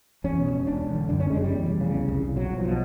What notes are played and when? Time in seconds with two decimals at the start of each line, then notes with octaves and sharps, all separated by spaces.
0.24 E2 C#4
0.38 B2
0.52 E1
0.67 E1 D4
0.81 E1
0.95 D3
1.09 F#2 D4
1.20 F#1 C#4
1.30 G#3
1.37 F#2 G3
1.52 E2
1.66 F1
1.81 C#3
1.94 C2
2.08 C2
2.22 C2
2.36 B1 F#3
2.50 B1
2.58 F3
2.65 B2